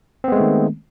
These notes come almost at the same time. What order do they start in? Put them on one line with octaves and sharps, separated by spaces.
C4 B3 G#3 A3 D#3